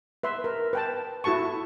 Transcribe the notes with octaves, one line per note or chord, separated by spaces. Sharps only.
B4 E5 C6
A#4
B4 G5 A5
E4 F#4 A4 A5 C#6